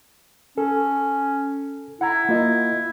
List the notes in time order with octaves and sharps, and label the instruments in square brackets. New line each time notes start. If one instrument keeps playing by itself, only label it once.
[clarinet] C#4 [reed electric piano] A4
[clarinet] E4 [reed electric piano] F#5 A#5
[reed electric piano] A#3 F4 D#5